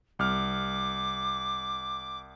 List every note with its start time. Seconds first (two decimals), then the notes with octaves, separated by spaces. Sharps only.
0.19 C2 D6 F6